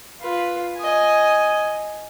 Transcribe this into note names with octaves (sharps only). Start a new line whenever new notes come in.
F4 B4
D#5 G#5